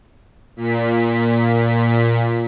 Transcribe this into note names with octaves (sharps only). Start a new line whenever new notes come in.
A#2 B6